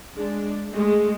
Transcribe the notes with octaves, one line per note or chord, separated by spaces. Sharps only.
G#3 D4
G#3 A3